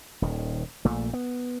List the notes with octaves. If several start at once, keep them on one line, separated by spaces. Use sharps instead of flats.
D#1 D#3
A#1 A#2 A3
B3